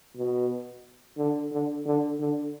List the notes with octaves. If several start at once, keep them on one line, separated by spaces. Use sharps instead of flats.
B2
D3
D3
D3
D3